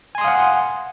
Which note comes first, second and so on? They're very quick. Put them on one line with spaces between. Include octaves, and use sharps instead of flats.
G#5 C6 D#6 F5 F#5